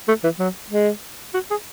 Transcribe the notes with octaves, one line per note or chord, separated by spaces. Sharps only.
A3
E3
F#3
G#3
F#4
G#4